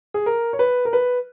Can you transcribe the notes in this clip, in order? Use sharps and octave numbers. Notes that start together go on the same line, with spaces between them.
G#4
A#4
C#5
B4
A#4
B4